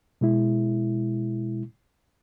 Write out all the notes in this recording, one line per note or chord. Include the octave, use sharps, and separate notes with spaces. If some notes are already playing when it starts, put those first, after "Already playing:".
B2 G#3 E4